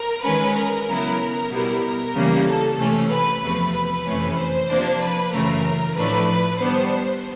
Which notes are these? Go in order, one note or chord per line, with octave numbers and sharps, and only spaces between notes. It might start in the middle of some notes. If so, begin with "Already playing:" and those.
Already playing: A#4
D#3 G#3 C#4 B4
A#4
C#3 F#3 B3 E4
B2 G3 B3 E4
A#4
C#3 E3 G3 A#3
A4
C3 E3 A3 C#4
B4
E2 C3 F3 A3
B4
F2 C3 E3 A3 C#4
C5
C3 F3 A#3 D4
B4
F#2 C#3 E3 A3 A#4
A2 F3 A3 D4 B4
D#3 G3 B3 D4 C5